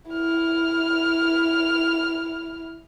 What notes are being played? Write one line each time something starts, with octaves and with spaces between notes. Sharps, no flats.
E4 F6